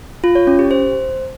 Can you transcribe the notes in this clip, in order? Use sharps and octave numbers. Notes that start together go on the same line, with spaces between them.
F4
C#5
C#4
G4
C5